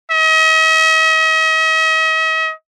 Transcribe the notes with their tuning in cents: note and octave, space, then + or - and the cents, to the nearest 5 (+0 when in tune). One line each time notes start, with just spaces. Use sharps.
D#5 +45